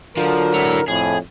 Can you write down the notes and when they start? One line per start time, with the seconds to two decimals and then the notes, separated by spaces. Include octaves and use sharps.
0.17 D3 F3 F#3 A#4
0.54 E4 C#5
0.88 F2 A2 G#4